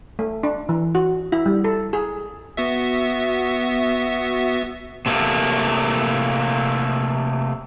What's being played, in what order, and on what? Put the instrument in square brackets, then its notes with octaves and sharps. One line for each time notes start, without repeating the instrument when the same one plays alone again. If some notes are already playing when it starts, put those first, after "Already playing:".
[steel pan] A3
D4
E3
F#4
E4
G3
A4
G#4
[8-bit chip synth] B3 F#4 E5
[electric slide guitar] C3 A3 A#3